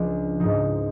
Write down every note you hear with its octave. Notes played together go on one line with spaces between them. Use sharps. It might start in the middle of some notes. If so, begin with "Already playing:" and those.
Already playing: C#2 C#3 F3 D4
G#2 F3 D#4